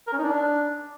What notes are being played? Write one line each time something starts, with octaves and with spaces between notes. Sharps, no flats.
A#4
C#4
D#4
D4